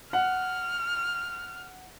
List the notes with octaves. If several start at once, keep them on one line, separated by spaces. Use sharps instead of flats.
F#5 F6